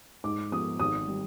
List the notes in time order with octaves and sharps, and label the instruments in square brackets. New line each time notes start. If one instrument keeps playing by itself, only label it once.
[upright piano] G#2 D6
F3 B3 D#6
G#1 D#6
G3